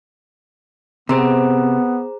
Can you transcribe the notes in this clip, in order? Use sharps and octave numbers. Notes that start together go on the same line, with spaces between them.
C3 B3 G#4 C5 A#5